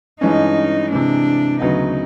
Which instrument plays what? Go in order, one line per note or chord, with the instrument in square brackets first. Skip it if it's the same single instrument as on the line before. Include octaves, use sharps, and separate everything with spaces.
[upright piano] G2 E3 G#3 C#4 [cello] D#4
[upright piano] C3 E3 G#3 [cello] D4
[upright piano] D2 C#3 F#3 B3 [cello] D#4